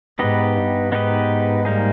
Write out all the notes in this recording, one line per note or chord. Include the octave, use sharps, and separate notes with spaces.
G#2 B3 D#4 G4 B4 D#5
G2
G#2 B3 D#4 G4 B4 D#5
G3 A#3 D#4 G#4